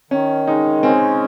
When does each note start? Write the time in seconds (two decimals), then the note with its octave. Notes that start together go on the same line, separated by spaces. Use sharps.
0.11 D#3 C#4
0.47 G#3 D#4
0.83 C4 C#4